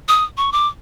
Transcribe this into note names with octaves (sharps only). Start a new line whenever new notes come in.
D#6
C#6
D6